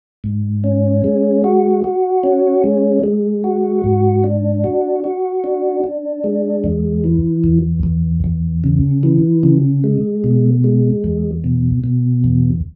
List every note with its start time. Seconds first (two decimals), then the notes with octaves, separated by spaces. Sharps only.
0.24 G#2
0.64 C#4
1.04 G#3
1.44 F#4
1.84 F#4
2.23 C#4
2.64 G#3
3.04 G#3
3.44 F#4
3.84 G#2
4.24 D4
4.64 F#4
5.04 F#4
5.44 D4
5.84 D4
6.24 G#3
6.64 E2
7.04 E3
7.44 E2
7.83 E2
8.24 E2
8.64 C#3
9.03 E3
9.43 C#3
9.84 G#3
10.24 B2
10.64 G#3
11.04 E2
11.44 B2
11.84 B2
12.24 E2